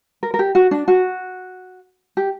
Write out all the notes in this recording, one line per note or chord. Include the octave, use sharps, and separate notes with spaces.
A#4
A#4
G4
F#4
D4
F#4
G4